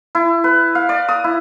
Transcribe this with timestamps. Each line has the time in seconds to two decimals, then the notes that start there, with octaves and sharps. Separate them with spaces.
0.15 E4
0.44 B4
0.75 F5
0.89 D5
1.09 D#6
1.24 E4